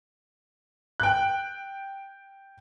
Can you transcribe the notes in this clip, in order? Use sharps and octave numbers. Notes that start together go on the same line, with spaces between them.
G5 F#6